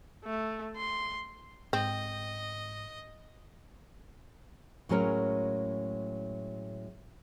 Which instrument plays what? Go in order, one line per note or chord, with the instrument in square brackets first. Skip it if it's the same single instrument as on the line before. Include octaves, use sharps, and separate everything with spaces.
[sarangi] A3
C6
[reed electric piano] G#2 [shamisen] C4 [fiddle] D#5
[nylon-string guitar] A2 F#3 G#3 C#4 A#4 C#5